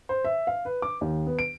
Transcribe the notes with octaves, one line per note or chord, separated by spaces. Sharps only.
C5
E5
F5
B4
D6
D#2
B3
D7